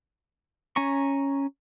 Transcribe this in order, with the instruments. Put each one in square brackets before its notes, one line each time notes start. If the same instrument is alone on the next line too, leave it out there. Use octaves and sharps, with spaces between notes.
[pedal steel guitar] C#4 G#5 A#5 C#6